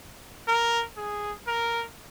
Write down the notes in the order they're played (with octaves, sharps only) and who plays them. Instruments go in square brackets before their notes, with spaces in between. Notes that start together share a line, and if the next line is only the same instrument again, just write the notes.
[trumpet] A#4
G#4
A#4